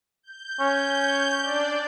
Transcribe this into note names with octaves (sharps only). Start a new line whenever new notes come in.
G6
C#4
D4 D5